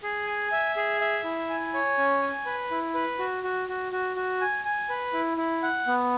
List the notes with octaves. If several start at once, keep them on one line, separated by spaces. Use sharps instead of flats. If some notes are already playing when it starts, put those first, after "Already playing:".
G#4
G#5
E5
G#4
E5
E4
G#5
C#5
C#4
G#5
B4
E4
B4
F#4
F#4
F#4
F#4
F#4
G#5
G#5
B4
E4
E4
F#5
B3